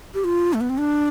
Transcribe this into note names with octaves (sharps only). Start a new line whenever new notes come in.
G4
F4
A3
B3
C4
D4